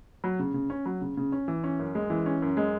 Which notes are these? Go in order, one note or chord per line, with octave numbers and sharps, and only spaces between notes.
F#3
C#3
C#3
C#4
F#3
C#3
C#3
C#4
E3
C#4
F#2
G#3
E3
C#4
F#2
G#3